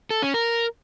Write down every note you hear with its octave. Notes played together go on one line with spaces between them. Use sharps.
A4
C#4
A#4